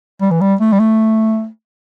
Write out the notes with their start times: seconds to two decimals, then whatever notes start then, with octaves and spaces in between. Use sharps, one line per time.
0.22 G3
0.31 E3
0.41 G3
0.60 A3
0.73 G3
0.79 A3